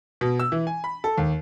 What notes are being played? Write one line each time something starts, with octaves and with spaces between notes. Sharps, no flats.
B2
E6
E3
G#5
B5
A4
D#2